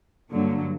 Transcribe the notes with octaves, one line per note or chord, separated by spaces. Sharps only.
G2 D3 F#3 A#3